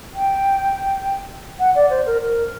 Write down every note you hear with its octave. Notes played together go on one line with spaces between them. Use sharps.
G5
F#5
D5
C5
A#4
A#4